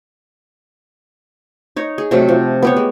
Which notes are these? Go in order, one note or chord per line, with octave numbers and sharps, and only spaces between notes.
D#4 C#5
G#4
C3 F#3 A3
F3
B3 G4 C#5
G#3